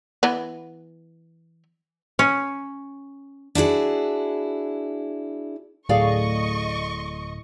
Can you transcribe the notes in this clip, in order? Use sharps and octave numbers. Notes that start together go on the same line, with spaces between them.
E3 B3
C#4
D4 E4 F#4 G#4
D1 A2 A3 G#4 D5 D#5 F5 C#6